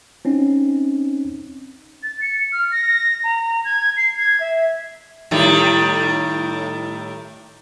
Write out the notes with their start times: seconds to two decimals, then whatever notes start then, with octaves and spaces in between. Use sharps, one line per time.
0.25 C4 C#4 D#4
2.03 A6
2.22 C#7
2.52 F6
2.72 A#6
3.24 A#5
3.65 G#6
3.97 C7
4.17 G#6
4.40 E5
5.31 A2 D#3 G3